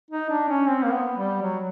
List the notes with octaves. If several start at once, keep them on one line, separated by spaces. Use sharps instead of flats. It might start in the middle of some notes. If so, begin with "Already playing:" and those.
D#4
D4
C#4
C4
A#3
B3
G3
F#3